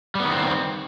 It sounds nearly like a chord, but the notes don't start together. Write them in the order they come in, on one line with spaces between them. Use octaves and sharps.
G3 B3 D#3 C4